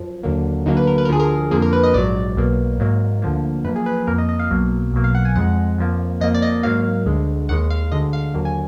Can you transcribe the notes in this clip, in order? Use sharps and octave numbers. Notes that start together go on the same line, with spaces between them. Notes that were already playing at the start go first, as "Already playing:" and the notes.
Already playing: F#2 F3
D#2 D3 F#3 A#3
D2 D3 F#3 A#3 D#4
B4
A#4
B4
A#4
D2 D3 F3 G#4
A#4
F2 D3 F3 A#3 G#4
A#4
B4
D#5
A#1 G#2 F#3 D5
B1 B2 F#3 A#3
G#2 F#3 A#3
D2 D3 F3 A#3
F#2 F3 A#3 B4
G#4
B4
B4
F2 F3 A#3 A#4
D#5
D#5
F5
B1 B2 F#3 A#3
B1 B2 F#3 A#3
F5
F#5
G#5
F2 F3 G#3 F#5
F2 F3 A#3
F2 F3 A#3 D#5
D5
D#5
G#2 F#3 A#3 F5
D2 D3 G#3
D#2 D#3 G#3 F#5
F5
D2 D3 G#3 D#5
F5
D#2 D3 F#3 A#3
G#5